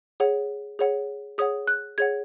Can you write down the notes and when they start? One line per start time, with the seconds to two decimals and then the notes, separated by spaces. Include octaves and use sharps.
0.20 G#4 C#5 F#5
0.79 G#4 C#5 F#5
1.38 G#4 C#5 F#5 D#6
1.67 F#6
1.98 G#4 C#5 F#5 G#6